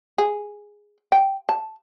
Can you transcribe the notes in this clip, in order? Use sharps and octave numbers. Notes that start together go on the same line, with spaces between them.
G#4
G5
A5